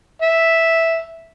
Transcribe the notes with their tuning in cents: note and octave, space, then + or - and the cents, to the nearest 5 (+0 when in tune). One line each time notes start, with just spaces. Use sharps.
E5 -5